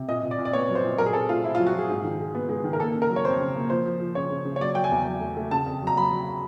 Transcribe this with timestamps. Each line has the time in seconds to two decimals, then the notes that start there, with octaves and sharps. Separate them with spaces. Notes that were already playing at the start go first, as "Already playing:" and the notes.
Already playing: C3
0.09 A#2 D#5
0.23 A#2
0.31 D5
0.38 A#2
0.45 D5
0.53 B3 C#5
0.69 F#3
0.75 C5
0.84 A#2
0.98 F#3 A#4
1.06 G#4
1.13 C4 A4
1.29 A3 F4
1.44 C4 E4
1.55 F4
1.59 F#3
1.67 F#4
1.74 F#3 G#4
1.90 G#2
2.04 D#3
2.19 G#3
2.35 B3
2.49 G#3
2.64 D#3
2.73 A#4
2.79 A#3 A4
2.95 C#3
3.02 A#4
3.09 F#3
3.16 C#5
3.25 F2 C5
3.40 C#3
3.55 A#3
3.70 F3 C5
3.86 F3
4.00 F3
4.15 C#3 C#5
4.31 C#3
4.45 C#3
4.56 C#5
4.61 F#3 D5
4.75 F#3 G5
4.84 G#5
4.92 E2
5.06 F#3
5.21 A3
5.37 A3
5.51 C#3 A5
5.66 F2
5.82 F#3 A#5
5.96 F#3 B5
6.12 F#3